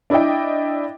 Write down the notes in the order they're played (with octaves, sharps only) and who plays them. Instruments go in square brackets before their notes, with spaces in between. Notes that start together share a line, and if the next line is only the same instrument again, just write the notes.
[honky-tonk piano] D4 E4 D5 D#5 G5